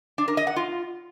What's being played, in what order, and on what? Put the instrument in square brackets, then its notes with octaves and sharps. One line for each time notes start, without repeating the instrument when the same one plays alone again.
[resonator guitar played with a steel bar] D4
A#4
D#5
F#5
F4